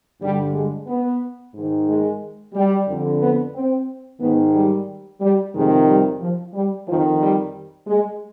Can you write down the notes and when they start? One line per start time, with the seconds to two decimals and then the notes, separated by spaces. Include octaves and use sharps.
0.20 G2 D3 G3
0.54 G#3
0.87 B3
1.54 G#2 D#3
1.88 G#3
2.54 G3
2.88 F2 D3
3.21 B3
3.54 C4
4.20 G#2 D#3 B3
4.55 G3
5.21 G3
5.54 F2 C3 D#3 G#3
5.87 G3
6.20 F3
6.54 G3
6.88 F2 D#3 F3
7.21 G3
7.87 G#3